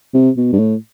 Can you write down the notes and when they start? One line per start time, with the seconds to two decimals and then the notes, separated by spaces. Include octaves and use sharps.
0.14 C3
0.37 B2
0.53 G2
0.59 A2